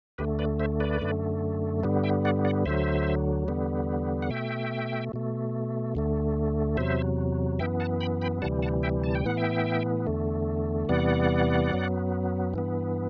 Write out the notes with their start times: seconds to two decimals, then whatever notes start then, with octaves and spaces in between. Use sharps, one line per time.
0.18 D2 D3 A3 G4 B4
0.39 B4 D5
0.60 C5 E5
0.80 B4 D5
1.01 F#2 D3 A3
1.83 G2 D3 G3 B3
2.04 E5 G5
2.25 D5 F#5
2.45 D5 F#5
2.65 D2 D3 F#3 C5 E5
3.48 E2 D3 G3 B3
4.22 F#5
4.30 B2 A3 E5 G5
5.13 B2 A3
5.95 D2 D3 A3
6.77 E2 C3 F#3 C5 E5
7.59 F#2 E3 B3 E5 G5
7.80 F#5 A5
8.01 G5 B5
8.22 G5 B5
8.42 D2 C3 E3 G3 F#5 A5
8.62 F#5 A5
8.83 E5 G5
9.04 A5
9.15 G5
9.25 A2 E3 B3 F#5
9.37 E5 G5
10.07 E2 D3 A3
10.89 E2 C3 E3 G3 B3 D5 F#5
11.72 F#2 F#3 B3
12.54 G2 E3 B3